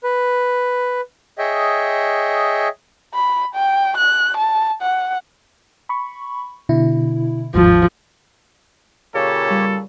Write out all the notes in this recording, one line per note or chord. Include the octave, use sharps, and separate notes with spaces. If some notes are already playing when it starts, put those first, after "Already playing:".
B4
G#4 C#5 D#5 E5 G5
B5
G5
F#6
A5
F#5
B5 C#6
B2 D3 E4
G1 D#2 G#2 F3
A#2 C#3 G4 A4 C#5
G3